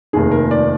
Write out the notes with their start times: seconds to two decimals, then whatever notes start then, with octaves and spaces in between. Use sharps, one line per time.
0.13 F1 D#2 D#3 G#4
0.31 A#4
0.51 D5